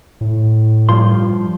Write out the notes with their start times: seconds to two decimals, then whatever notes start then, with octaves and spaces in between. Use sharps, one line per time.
0.21 A2
0.89 G2 F3 C6